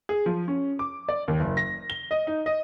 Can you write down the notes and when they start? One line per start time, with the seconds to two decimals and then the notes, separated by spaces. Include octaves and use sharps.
0.09 G#4
0.26 F3
0.48 C#4
0.79 D6
1.09 D5
1.28 D#2
1.40 F#1
1.57 A#6
1.90 G7
2.11 D#5
2.27 D#4
2.46 D#5